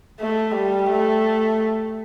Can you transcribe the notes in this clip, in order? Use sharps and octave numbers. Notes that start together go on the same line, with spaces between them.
A3
G3
A3